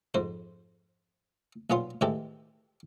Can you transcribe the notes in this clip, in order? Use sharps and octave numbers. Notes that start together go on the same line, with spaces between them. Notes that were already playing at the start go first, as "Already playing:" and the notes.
F2 G#2 C5
B1 A#2 B3 C#4 F4 C6
A1 D#3 E3 G#3 G4 A4